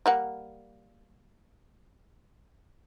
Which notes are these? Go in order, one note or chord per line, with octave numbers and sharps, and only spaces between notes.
G3 A#3 F#5